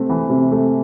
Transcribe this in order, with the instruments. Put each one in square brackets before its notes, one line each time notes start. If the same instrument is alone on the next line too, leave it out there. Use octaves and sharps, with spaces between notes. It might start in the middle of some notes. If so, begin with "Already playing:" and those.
Already playing: [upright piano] C3 A3 C4
E3
C3
A3